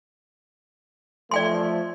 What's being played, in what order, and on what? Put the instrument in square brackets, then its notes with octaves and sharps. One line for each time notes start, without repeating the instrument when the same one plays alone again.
[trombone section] F3 A3 [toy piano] D5 G5 C6